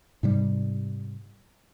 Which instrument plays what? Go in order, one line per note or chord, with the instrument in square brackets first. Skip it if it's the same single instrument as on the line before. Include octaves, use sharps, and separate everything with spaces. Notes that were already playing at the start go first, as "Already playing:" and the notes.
[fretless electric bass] G#2 C3 G3